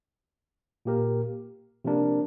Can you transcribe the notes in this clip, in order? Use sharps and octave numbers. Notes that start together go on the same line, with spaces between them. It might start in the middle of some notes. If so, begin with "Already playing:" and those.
A#2 A#3 G4 A#4
C3 F3 A#3 D4 A#4